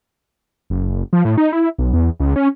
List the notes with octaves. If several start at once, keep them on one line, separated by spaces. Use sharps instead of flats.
F#1
F3
A2
D#4
E4
B1
E2
C#2
C#4